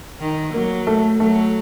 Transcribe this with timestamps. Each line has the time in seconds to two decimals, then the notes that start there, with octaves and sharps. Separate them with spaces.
0.20 D#3
0.53 F#3 A#3
0.87 A3
1.20 F#3 A3